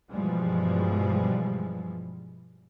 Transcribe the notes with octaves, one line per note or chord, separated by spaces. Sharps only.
G2 B2 E3 F3 G3 G#3